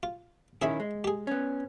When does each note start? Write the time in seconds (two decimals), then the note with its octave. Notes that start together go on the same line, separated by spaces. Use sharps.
0.03 F4
0.62 D#3 C#4 E4 G#4 E5 B5
0.80 G#3
1.04 G4 G#4
1.27 B3 C#4